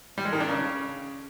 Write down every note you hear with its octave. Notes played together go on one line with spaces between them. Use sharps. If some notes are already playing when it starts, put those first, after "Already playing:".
G3
G#3
D#3
D4
C#3